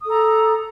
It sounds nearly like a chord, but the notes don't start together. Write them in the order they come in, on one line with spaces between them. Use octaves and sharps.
D#6 A4 A#5